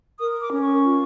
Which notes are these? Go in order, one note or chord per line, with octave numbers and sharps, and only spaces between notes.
A#4 D#6
D6
C#4
C#6
F4